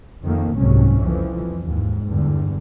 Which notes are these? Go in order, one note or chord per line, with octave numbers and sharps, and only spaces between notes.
F2 D#3 A3 A#3
F#1 C2 G#2 C3 F#3 C#4
F2 E3 F3
D#2 G#2
E2 G2 D3